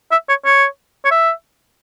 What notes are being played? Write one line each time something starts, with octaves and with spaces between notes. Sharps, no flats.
E5
C#5
C#5
C#5
E5